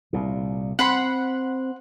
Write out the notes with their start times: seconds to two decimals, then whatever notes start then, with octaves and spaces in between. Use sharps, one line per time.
0.13 C2 A#2
0.79 C4 F#5 B5 C6